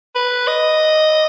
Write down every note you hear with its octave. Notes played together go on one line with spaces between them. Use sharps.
B4
D#5